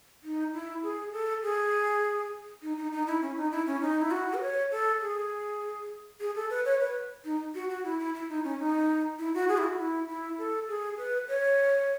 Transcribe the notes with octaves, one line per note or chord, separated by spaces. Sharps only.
D#4
E4
G#4
A4
G#4
D#4
D#4
D#4
E4
C#4
D#4
E4
C#4
D#4
E4
F#4
B4
C#5
A4
G#4
G#4
A4
B4
C#5
B4
D#4
F#4
F#4
E4
E4
E4
D#4
C#4
D#4
E4
F#4
G#4
E4
F#4
E4
E4
A4
G#4
B4
C#5